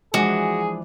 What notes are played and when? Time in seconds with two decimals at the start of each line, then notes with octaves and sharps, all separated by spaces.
0.14 E3 F3 G#3 D4 F#4 G#4